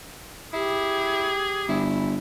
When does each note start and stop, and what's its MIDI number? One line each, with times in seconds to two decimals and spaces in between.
0.53 1.34 64
0.53 1.82 67
0.53 1.92 68
1.69 2.18 31
1.69 2.16 64